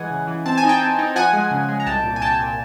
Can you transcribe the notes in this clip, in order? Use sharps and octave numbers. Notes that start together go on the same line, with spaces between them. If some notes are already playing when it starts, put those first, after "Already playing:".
Already playing: E3 G#3 F#5 G#5
C#3
E3
C4 A5
G#5
D#4
G5 A5
C4
D#4
F3 F#5 G#5
G#3
C#3
G#3
A#5
C2 G5 A5
A#2
G#5
C2 G5 A5
A#2